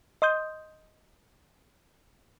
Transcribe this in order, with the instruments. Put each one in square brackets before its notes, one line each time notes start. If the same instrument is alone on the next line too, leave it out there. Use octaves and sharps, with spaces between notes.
[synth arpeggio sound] D#5 C6 D#6 G6